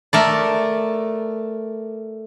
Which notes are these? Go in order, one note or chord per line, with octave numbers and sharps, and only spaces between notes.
A3 A#4 D5